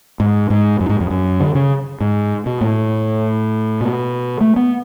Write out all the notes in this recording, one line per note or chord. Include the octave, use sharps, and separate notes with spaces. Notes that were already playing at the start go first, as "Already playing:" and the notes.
G#2
G#2
F#2
G#2
F2
F#2
D3
C#3
G#2
B2
A2
B2
A3
B3